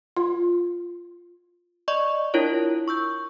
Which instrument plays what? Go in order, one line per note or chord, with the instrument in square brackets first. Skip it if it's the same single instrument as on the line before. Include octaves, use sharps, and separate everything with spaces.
[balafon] F4
[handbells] D5 D#5 C#6
D4 E4 F4 A#4 C#5
C#6 E6 G6